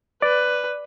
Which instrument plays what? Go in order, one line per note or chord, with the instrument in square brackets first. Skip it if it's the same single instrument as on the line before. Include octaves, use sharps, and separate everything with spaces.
[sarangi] B4 [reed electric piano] D5